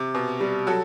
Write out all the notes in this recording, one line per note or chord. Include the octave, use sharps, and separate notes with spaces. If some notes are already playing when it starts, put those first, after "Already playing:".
Already playing: C3
B2
G3
F#3 F#4 A4